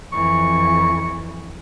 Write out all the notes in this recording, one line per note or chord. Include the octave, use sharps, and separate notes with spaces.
F2 E3 C#6